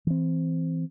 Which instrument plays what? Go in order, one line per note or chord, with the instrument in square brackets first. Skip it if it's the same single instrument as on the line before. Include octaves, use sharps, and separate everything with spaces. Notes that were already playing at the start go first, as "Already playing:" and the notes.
[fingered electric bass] E3 C4